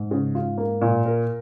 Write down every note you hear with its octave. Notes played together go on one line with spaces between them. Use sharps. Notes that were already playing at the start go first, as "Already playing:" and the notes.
Already playing: G#2
C#3
F4
A#3
A#2
A#4